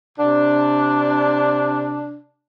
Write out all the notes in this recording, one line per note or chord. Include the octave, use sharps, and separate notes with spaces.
C3 D4